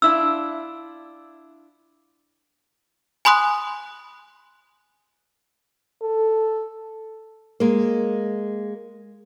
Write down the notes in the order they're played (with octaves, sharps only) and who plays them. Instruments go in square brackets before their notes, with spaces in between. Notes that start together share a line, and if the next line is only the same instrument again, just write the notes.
[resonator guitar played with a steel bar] D4 E4 F4 [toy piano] E6
[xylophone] G#5 B5 C6 D#6 F#6
[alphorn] A4
[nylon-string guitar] G#3 A#3